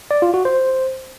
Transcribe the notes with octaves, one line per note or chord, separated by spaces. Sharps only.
D5
F4
F#4
C5